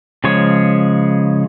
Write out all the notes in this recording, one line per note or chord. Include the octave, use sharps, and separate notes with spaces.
C#3 F3 G#3 C#5